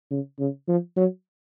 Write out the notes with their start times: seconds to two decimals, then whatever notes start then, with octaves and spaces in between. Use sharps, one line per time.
0.11 C#3
0.40 C#3
0.68 F3
0.97 F#3